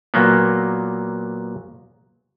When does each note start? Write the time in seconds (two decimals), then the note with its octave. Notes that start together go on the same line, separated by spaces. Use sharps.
0.14 A#2 F#3 A#3 B3